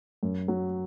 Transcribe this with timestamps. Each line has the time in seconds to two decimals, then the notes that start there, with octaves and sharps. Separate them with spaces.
0.23 F#2
0.48 F#3